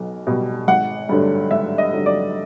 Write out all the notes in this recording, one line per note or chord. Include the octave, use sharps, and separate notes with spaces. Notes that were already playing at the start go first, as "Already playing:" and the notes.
Already playing: B1 B2
B2 G3
G#1 F#5
G2 D3 F#3 A3
G#1 E5
D#5
G2 D3 F#3 A3
D5